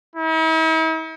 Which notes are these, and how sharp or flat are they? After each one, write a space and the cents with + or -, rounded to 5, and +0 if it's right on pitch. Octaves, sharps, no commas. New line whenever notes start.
E4 -45